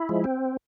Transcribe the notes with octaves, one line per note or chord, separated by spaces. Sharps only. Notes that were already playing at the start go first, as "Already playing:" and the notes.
Already playing: E4
F3 G#3
C4